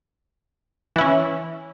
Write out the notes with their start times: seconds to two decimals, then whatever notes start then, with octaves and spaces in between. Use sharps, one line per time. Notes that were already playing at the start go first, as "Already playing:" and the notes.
0.96 E3
0.98 E4
1.01 C#4